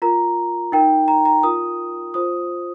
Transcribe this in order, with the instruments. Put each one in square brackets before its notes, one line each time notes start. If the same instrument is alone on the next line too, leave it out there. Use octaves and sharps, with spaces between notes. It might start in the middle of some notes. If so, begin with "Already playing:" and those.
[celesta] F4 A#4 A#5
D#4 A#4 G5
A#5
A#5
F4 A#4 D#6
F4 C5 D#6